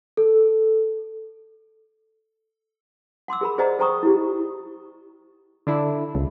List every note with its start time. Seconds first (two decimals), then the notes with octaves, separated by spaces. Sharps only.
0.17 A4
3.28 F#5 C6 D6 E6
3.41 G#4 A#4 B5
3.58 G#4 C5 D5 D#5 F#5 A#5
3.79 A4 C5 G5 A#5 C#6 D#6
4.03 E4 G4
5.67 D3 D4 E4
6.15 C#2